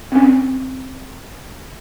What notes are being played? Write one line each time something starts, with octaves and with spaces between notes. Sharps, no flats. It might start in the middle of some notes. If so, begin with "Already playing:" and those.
C4 C#4